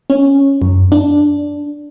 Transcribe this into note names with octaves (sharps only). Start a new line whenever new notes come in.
C#4
F#2
D4